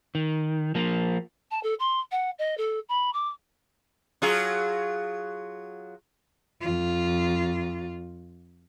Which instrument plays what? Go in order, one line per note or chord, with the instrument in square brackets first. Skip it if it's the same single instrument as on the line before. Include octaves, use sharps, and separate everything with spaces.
[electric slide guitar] D#3
F3 A#3
[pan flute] A5
A4
C6
F#5
D#5
A4
B5
D6
[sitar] F#3 F4 G#4
[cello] F2 F4